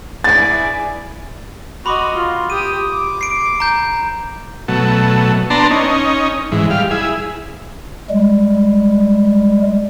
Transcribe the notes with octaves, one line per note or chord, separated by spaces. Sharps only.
E4 G#4 B4 D5 G#5 A6
F#4 D#5 B5 C6 D6
F4
G4 D#6 D#7
D6
C7 D7
A#5 G6
B2 F#3 A3
B3 D4 A5 A#5 C6
C#4 D#4
G#2 E3
G3 F5
E4 G#4
G3 G#3